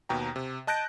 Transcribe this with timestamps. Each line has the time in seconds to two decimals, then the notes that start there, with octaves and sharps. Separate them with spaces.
0.09 D#2 B2 G5 A#5
0.36 C3
0.67 D#5 A5 F#6 G6 A#6 D7